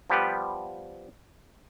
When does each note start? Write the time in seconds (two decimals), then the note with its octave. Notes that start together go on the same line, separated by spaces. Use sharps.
0.10 F3 G3 B3 G4 B4